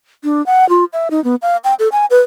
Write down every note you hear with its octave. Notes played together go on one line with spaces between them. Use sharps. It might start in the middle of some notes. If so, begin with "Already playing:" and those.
D4
F#5
F4
E5
D#4
B3
F5
G5
A4
G#5
B4